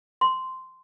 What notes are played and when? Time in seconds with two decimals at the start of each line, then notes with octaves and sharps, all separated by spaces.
0.21 C6